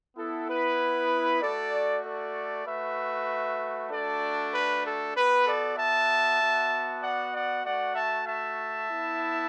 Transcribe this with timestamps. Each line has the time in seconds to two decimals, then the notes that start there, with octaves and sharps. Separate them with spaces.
0.17 B3 E4 A4
0.48 B4
1.42 A3 F#4 A4 D5
2.04 A4 D5
2.66 A3 F#4 B4 E5
3.90 A3 D4 F#4 A4 D5
4.53 B4
4.85 A4
5.15 B3 F#4 B4
5.46 A4 D5
5.77 E5 A5
6.40 B3 F#4
7.02 D5 F#5
7.32 D5 F#5
7.64 A3 F#4 D5 F#5
7.95 E5 A5
8.26 E5 A5
8.89 B3 E4